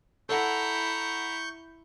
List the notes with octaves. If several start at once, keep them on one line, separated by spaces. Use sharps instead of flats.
E4 A4 F#5 A#5 C#6 G6